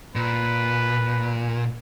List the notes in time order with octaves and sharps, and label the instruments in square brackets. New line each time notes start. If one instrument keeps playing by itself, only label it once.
[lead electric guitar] A#2 [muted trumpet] B4